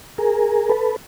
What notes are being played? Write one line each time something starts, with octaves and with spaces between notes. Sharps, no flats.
G#4 A#4
A4 B4